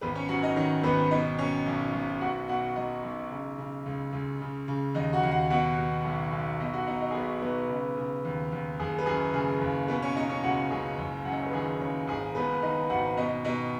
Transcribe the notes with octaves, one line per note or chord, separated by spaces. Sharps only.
G#1 B3 B4
C#4 C#5
F#2 F#4 F#5
D#4 D#5
D#3 C#4 C#5
G#1 B3 B4
B2 D#4 D#5
B2 C#4 C#5
B1
B1
B2 F#4 F#5
B2 F#4 F#5
B1 D#4 D#5
B1
C#3
C#3
C#2
C#2
C#3
C#3
D#2 D#4 D#5
F#4 F#5
D#2
F#4 F#5
B2 F#4 F#5
B2
B1
B1
B2 D#4 D#5
F#4 F#5
B2 D#4 D#5
D#4 D#5
G#4
B1 B3 B4
B1 B3 B4
C#3
C#3
D#2
D#2
F#1 G#4
B4
F#2 G#4
C#3 G#4
F#1
B2 B3 B4
C#4 C#5
B2 D#4 D#5
C#4 C#5
C#2 F#4 F#5
C#2 G#4
F#1
F#2 F#5
D#5
C#5
B4
D#3 G#4
F#1 C#4 C#5
G#1 G#4
G#2 B3 B4
D#3 D#4 D#5
G#1 F#4 F#5
B2 D#4 D#5
B2 D#4 D#5